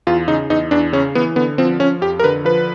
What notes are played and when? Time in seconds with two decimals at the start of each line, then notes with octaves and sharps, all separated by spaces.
0.07 E2 F4
0.28 C#3 D#4
0.50 E2 D#4
0.71 E2 D4
0.93 C#3 C#4
1.15 E3 B3
1.36 D3 B3
1.58 F3 C4
1.80 F3 C#4
2.01 F2 G4
2.20 A#4
2.24 D3 B4
2.45 F3 B4